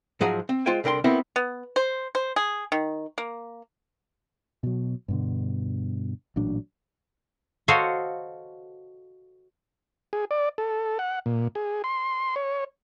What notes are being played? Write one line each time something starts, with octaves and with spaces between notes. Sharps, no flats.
G#2 F3 F#3 G#4 F#5 A#5
C4
G#3 F4 C5 G5 G#5
C2 D3 A#4 G5 C6
B3 C4 D#4 E4 G4 A#4
B3
C5
C5
G#4
D#3
A#3
B2 F#3
G2 B2 D3
A1 A#2 F#3 D4
F#4 A4 C5 C#5 D#5 F5
G#4
D5
A4
F#5
A#2
G#4
C6
C#5